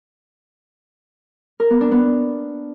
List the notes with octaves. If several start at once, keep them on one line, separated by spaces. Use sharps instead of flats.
A#4
B3
D4
B3